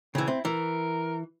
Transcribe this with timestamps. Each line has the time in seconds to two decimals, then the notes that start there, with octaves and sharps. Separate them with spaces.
0.15 C#3 E3 C4
0.28 C4 E4
0.45 E3 A#4